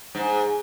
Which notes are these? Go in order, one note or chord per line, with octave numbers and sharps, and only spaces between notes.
G#2